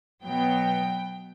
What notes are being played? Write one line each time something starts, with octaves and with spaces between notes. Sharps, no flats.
B2 F#3 B3 G5